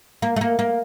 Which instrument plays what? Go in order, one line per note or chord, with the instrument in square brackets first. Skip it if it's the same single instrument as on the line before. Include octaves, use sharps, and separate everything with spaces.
[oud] A#3
A3
A#3
A#3